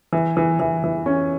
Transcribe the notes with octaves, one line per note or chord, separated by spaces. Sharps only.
E3
E3
E3
E3
C#4